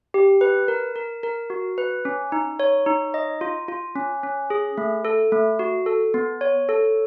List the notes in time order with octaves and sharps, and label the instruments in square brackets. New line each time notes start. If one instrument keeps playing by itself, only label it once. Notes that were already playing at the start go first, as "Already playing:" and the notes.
[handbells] G4
B4
A#4
A#4
A#4
F#4
B4
C#4
D#4
C#5
D#4
D#5
F4
F4
C#4
C#4
G#4
A3
A4
A3
F#4
A4
B3
C#5
A4